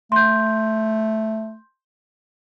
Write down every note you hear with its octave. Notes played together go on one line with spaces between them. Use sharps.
A3 C6 G6